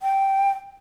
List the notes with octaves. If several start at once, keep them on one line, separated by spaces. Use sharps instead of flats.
G5